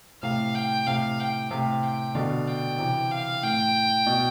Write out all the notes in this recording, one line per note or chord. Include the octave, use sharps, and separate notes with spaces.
A2 C3 F5
G5
A2 C3 F5
G5
A2 C3 F5
G5
B2 D3 F5
G5
C3 E3
F5
A2 G5
B2